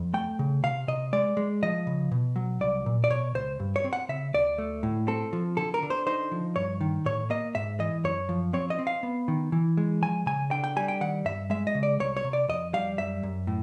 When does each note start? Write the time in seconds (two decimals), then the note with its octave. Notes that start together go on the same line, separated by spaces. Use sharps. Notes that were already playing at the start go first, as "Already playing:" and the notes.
Already playing: F2
0.14 A3 G5
0.39 C#3
0.63 C3 F5
0.88 C3 D#5
1.13 G#3 D5
1.37 G#3
1.63 F3 D#5
1.87 C#3
2.12 B2
2.36 F#3
2.61 C2 D5
2.86 A#2
3.04 D5
3.10 B2 C#5
3.35 C#2 C5
3.60 G2
3.76 C#5
3.84 C4
3.93 F#5
4.09 C#3 E5
4.34 D2 D5
4.58 A3
4.83 A2
5.08 C4 A4
5.33 F3
5.57 D3 A4
5.74 A#4
5.82 D3
5.90 C5
6.07 D#4 C5
6.32 F3
6.56 G2 C#5
6.81 D#3
7.06 A2 C#5
7.30 A#3 D#5
7.55 G#2 E5
7.79 E3 D#5
8.04 F#2 C#5
8.29 F3
8.53 C4 C#5
8.70 D#5
8.79 C4
8.87 F5
9.03 B3
9.28 D#3
9.52 E3
9.77 G#3
10.02 F3 G#5
10.26 C#3 G#5
10.51 D3 G5
10.64 G5
10.76 G3 G#5
10.88 G5
11.01 D#3 F#5
11.25 G2 E5
11.50 G#3 E5
11.67 D#5
11.75 C#3
11.83 D5
12.00 C2 C#5
12.17 C#5
12.24 C3
12.33 D5
12.48 F2 D#5
12.73 G3 F5
12.98 F#2 E5
13.23 F#2
13.47 A2